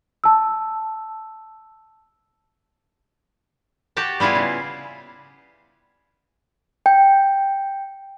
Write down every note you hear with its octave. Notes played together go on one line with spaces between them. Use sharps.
A5 E6
F#4 G4 G5 A5
G3 B3 E4 F4 G#4
C#3
G5